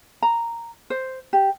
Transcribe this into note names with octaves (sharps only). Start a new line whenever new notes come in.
A#5
C5
G4